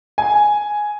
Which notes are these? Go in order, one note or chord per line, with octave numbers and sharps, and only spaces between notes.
G#5